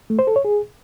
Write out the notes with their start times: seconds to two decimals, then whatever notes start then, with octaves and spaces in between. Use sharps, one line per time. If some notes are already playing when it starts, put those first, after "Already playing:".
0.10 A3
0.19 C5
0.27 A4
0.36 C#5
0.45 G#4